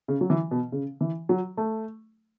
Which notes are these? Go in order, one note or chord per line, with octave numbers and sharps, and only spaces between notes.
C#3
F#3
E3
B2
C#3
E3
F#3
A3